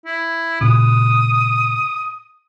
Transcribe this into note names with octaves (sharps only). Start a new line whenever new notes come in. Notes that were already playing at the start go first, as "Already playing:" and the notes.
E4
A#2 C#3 D#6